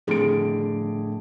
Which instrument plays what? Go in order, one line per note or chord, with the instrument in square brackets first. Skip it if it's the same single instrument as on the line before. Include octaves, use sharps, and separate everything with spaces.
[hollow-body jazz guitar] F2 A2 D3 [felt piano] G#4 D7